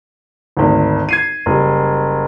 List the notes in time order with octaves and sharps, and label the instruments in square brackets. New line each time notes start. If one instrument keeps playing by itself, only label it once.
[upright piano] G#1 D2
G#6 C7 D#7
F#1 G3